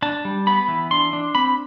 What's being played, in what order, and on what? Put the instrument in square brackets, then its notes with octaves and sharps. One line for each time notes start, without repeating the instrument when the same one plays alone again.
[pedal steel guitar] D4 A5
G3
B3 B5
E3
D4 C6
D4
C4 B5